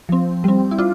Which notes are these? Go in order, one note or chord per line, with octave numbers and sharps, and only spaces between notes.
F3 C4
G3 C4
E4
D4 F4